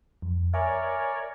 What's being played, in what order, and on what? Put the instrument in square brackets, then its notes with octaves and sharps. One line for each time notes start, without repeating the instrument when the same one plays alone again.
[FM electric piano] F2
[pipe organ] A#4 C#5 D5 [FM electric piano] E5 G#5